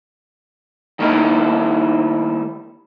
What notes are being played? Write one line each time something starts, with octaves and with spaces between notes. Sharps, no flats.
D#3 G3 A3 A#3 D#4 E4